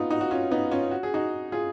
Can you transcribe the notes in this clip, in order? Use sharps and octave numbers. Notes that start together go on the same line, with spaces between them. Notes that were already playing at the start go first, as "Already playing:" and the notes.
Already playing: B3 D#4 F4
D#4 F#4
F#4
C#4 F4
B3 D#4
C#4 F4
F#4
G#4
D#4 F#4
F4 G#4